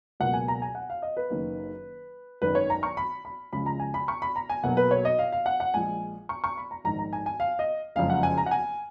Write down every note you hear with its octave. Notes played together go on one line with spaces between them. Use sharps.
C#2 B2 F#3 A#3 F#5
G#5
A#5
G#5
F#5
F5
D#5
B4
F#1 F#2 D#3 A#3
G#1 F#2 D#3 B4
C#5
A#5
C#6
B5
B5
C#2 C#3 F3 G#3 B5
A#5
G#5
B5
C#6
B5
A#5
G#5
B1 B2 F#3 A#3 F#5
B4
C#5
D#5
F5
F5
F#5
F#5
A#1 A#2 G#3 G#5
C#6
C#6
B5
A#5
A#1 G#2 D#3 A#5
A#5
G#5
G#5
F5
D#5
F#1 F2 C#3 G#3 F5
F#5
G#5
A#5
F#5
G#5